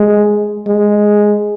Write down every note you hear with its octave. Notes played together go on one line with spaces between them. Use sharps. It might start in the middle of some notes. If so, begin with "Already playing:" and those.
Already playing: G#3
G#3